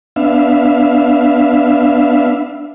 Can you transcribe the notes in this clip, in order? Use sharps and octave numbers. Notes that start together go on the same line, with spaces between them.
B3 D4 E5 F5